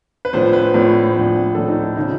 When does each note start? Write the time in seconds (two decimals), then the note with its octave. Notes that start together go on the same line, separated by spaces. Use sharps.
0.25 B4
0.33 A#1 A2 F3 C5
0.53 B4
0.74 A#1 A2 F3
1.15 A#1 A2 F3
1.55 A#1 A2 F3 A4
1.69 D#4
1.82 E4
1.96 D#4
1.99 C#3 F3